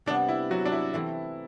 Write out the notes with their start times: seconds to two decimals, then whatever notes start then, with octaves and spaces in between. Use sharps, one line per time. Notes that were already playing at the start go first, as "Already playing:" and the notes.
0.06 C3 G3 B3 D4
0.28 E4
0.51 F#3 F#4
0.65 D4
0.72 E4
0.94 E3 A3 C4 E4